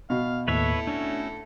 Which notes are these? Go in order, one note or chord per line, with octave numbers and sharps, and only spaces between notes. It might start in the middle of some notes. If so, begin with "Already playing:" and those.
B2 F5
D#2 A2 E4 A4 B4 C#5 E5
A3 C#4 D4 F#4